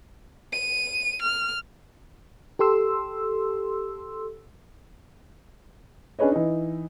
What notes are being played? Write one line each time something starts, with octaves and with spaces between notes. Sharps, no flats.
D#7
F6
G4 A4 C6 E6
C#4 D4 G#4 B4 C#5 D#5
E3 D#4